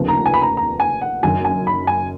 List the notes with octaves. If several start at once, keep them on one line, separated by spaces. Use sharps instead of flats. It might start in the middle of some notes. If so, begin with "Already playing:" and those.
Already playing: F1 D#2 C#3 F3 B3
A#5
G#5
B5
A#5
A#5
G#5
F#5
F#1 F#2 D#3 G#5
G#5
B5
G#5